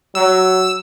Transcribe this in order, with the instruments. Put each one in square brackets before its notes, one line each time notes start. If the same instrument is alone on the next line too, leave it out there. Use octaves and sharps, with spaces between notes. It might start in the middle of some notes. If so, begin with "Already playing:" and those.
[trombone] F#3 [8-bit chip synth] E6